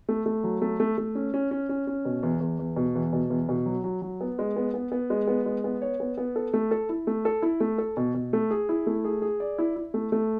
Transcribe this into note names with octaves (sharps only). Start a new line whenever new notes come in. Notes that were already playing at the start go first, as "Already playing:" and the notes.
A3
A3
F#3
A3
A3
A3
C#4
C#4
C#4
C#4
C#4
B2
E2
E2
E2
B2
E2
B2
E2
B2
F#3
F#3
F#3
B3
G#3
B3
B3
B3
G#3
B3
G#3
B3
C#5
B3
B3
A4
A3
A4
E4
A3
A4
E4
A3
A4
B2
B2
A3
G#4
E4
A3
G#4
G#4
D5
E4
E4
A3
A3